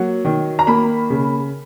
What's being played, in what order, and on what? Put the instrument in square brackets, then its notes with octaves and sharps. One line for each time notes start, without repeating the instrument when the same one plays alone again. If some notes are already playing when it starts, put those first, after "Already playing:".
Already playing: [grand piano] F#3 A#3 F#5
D#3
A#5
A#3 B5
C#3